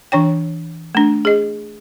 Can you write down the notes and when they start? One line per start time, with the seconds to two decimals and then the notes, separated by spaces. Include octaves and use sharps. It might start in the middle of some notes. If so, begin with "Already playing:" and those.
0.12 E3 D4 C#5 G5
0.95 A3 D4
1.25 G#4 D#5